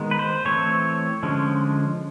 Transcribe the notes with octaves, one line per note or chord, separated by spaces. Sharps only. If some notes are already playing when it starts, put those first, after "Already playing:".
Already playing: D#3 G#3 B3
B4
C5
E3 A3 C4 C#5
D3 F3 G#3 C#4